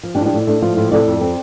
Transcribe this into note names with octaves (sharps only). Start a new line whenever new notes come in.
F3
D4 G4
A2
D4 G4
A2
A3 D4
F3 F4
A2 F4
C3 A4 D5
F2
C4